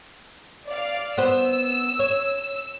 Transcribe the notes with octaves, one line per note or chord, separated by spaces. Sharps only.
D5 F5
B3 C5 E6
C#5